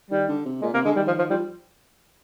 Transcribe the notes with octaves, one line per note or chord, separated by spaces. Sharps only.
D#3 G3
D3
C3
A#2 G#3
C3 A#3
D3 G#3
D#3 G3
F3
F3
F3 G3